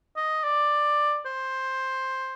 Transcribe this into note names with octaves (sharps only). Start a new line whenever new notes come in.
D#5
D5
C5